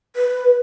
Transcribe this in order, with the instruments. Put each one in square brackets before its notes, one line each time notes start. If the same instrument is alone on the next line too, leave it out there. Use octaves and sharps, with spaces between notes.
[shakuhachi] B4